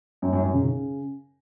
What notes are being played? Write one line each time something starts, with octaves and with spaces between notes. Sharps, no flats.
F#2
F#2
F#2
C#3
C#3